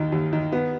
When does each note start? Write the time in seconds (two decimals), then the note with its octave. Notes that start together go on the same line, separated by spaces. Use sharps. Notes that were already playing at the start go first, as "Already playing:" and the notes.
Already playing: D#2 D#3
0.12 D#2
0.33 D#3
0.52 B3